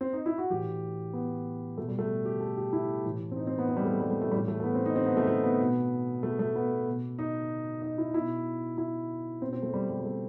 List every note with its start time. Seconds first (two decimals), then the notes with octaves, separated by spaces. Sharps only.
0.01 C4
0.13 D#4
0.26 E4
0.38 F#4
0.50 A2 E3 G4
1.13 B3
1.77 B2 A3
1.88 G3
1.99 A3
2.25 G4
2.41 A4
2.57 G4
2.73 E4
3.05 A2 E3
3.31 C4
3.36 D#4
3.47 C4
3.58 B3
3.69 C4
3.77 G3
3.85 A3
4.01 G3
4.11 A3
4.22 A3
4.31 A2 E3 G3
4.48 A3
4.60 A3
4.63 B3
4.75 C4
4.85 D#4
4.96 C4
5.06 B3
5.17 A3
5.27 A3
5.44 B3
5.60 B2
6.23 A3
6.39 A3
6.56 B3
6.87 B2
7.19 D#4
7.82 D#4
7.98 E4
8.14 B2 E4
8.78 E4
9.42 B2 C4
9.53 C4
9.63 A3
9.74 G3
9.89 G3
10.00 G3
10.06 A3